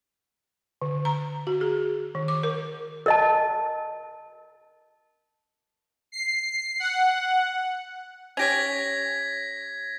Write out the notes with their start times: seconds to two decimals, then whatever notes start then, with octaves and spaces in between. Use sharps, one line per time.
0.82 D3
1.05 A#5
1.47 F#4
1.61 G#4
2.15 D#3
2.28 D6
2.43 A#4
3.06 A#4 D#5 A5
6.12 C7
6.80 F#5
8.37 C#4 G4 C#5 G#6 A#6 B6